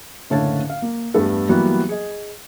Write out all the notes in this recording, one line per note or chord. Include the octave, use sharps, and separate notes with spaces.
F#1 A2 D3 C#5 F5 A5
F5
A#3
E2 G2 A3 B3 A4 B4
E3 F#3 G3 A#3 B3 F#4
G#4 D#5